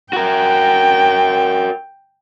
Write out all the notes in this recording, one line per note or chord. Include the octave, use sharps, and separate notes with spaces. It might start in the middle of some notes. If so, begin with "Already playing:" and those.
F#4 A#4 G5